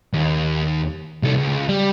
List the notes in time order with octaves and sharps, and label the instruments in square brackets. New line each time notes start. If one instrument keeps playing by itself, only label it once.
[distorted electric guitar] D#2
C2 A4
C#2
G3